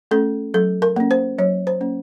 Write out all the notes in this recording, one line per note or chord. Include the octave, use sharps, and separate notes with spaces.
A3 C#4 A4
F#3 A4
A#4
A#3 C#4
C5
F#3 C#5
C5
A#3 C#4